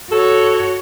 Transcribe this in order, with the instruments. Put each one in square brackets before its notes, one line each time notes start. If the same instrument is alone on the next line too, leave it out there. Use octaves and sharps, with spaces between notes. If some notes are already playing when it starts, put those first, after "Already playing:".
[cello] F#4 C#5 [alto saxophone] A4